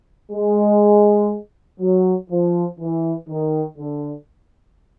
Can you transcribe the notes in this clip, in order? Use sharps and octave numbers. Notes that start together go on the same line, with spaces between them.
G#3
F#3
F3
E3
D#3
D3